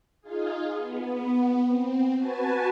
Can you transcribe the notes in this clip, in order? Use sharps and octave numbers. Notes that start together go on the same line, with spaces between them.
D#4 F4 G#4
B3
C4
F#4 B4 G#5 A5